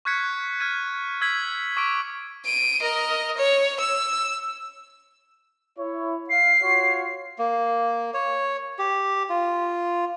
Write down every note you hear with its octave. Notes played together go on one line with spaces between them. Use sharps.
C#6 F6 F#6 G#6 B6 C#7
F6 G#6 D#7
E6 G#6 B6 F#7
C#6 D6 E6 B6 D7
D7 D#7
A#4 D#5
C#5
E6
E4 C#5
F5 C7
F4 F#4 C#5
A#3
C#5
G4
F4